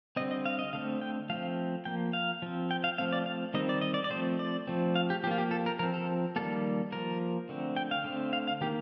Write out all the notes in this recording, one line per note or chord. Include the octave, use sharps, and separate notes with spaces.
D3 G3 C4 D#5
D#5
F5
D#5
D3 A3 C4 F5
G5
F3 A3 C4 F5
F3 A#3 G5
F5
F3 C4
G5
F5
F3 A3 C4 F5
D5
F5
D#3 G3 C4 D#5
D5
D#5
D5
D5
F3 A3 C4 C5
D5
F3 A3 C4
F5
G4
F3 A#3 F4 G4
G4
A4
A#4
F3 C4 A#4
A4
D#3 G3 A#3 A4
F3 A#3 A#4
D3 A3 C4
G5
F5
D3 A3 C4
F5
F5
D#3 A#3 G4